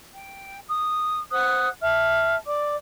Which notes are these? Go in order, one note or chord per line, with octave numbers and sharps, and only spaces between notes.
G5
D#6
C5 F#5 D#6 F#6
E5 A5 F6
D5 D6